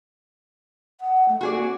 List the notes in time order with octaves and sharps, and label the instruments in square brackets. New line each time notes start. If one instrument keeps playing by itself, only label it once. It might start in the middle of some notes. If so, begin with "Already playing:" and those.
[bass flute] F#5
A3
[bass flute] A#3 [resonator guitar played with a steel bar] F#4 G#4 D5
[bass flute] C4